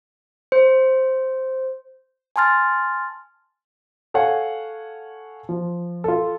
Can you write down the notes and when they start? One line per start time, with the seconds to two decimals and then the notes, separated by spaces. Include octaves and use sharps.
0.52 C5
2.36 G#5 A5 C6 F6 A6
4.14 A4 C#5 F5 F#5 G#5
5.49 F3
6.04 F4 A4